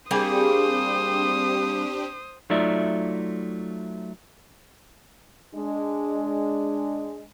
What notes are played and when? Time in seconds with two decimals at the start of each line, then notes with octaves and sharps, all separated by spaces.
0.11 G3 A#3 C4 D4 G4 G#4 C5 D#6
2.50 F#3 A3 D#4 F4 D5 E5
5.54 G#3 D4